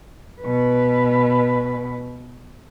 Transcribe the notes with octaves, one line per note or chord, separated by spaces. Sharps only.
B2 B4